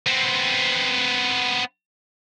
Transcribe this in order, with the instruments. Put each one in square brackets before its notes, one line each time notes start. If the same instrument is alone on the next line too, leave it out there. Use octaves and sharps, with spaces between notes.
[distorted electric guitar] B3 C4